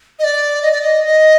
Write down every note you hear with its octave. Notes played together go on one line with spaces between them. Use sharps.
D#5
D5
D#5
D5
D#5
D#5